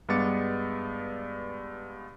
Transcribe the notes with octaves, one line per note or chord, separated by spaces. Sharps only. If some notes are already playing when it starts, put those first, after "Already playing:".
G2 G#3 B3 D6 A6 C#7